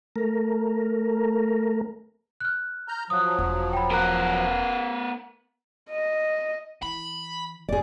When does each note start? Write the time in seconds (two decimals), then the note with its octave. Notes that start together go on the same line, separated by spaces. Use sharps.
0.16 A3 A#4
2.40 F6 F#6
2.88 A#5 F6 G6
3.10 F3 F#3 D#6 F#6
3.38 E1
3.73 G5 B5
3.91 B3 A#4 A#5 F#6
5.90 D#5
6.82 E3 B5
7.69 F1 D3 G#4 D5